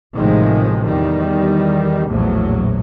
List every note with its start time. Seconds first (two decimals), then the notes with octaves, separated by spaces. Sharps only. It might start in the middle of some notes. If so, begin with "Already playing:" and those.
0.16 A1 A2 C3 D#3 F3 G#3
0.85 E2 D#3 G3
2.08 A#1 E2 A2 F#3